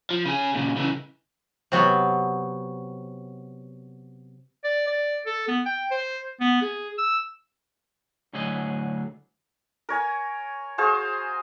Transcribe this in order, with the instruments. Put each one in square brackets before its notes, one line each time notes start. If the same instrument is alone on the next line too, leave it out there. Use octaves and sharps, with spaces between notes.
[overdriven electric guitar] F3
C#3 G#4
A#2 C#3
C#3 E3
[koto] C3 F#3 B3
[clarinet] D5
D5
A4
B3
G5
C5
B3
G#4
E6
[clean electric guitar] D2 A2 D3 F#3 G#4 D#5
[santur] A#4 C#5 G#5
F#4 G#4 C5 F5